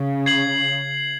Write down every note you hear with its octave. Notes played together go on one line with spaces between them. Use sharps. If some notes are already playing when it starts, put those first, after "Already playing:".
Already playing: C#3
G#6 C7 F#7